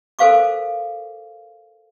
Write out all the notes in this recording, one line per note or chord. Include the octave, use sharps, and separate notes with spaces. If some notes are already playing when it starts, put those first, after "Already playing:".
A4 A#4 C5 F5 C#6 D6